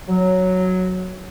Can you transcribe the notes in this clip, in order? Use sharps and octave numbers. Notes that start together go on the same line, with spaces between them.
F#3